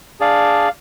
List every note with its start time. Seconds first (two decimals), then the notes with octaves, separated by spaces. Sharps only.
0.20 D4 G#4 D5 F5